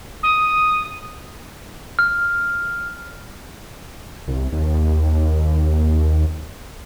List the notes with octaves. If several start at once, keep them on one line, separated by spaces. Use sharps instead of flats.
D#6
F6
C2
D#2